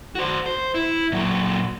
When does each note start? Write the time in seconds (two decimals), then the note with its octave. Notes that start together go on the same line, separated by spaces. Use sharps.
0.15 F#4 C5
0.46 C5
0.74 E4
1.12 A#2 F#3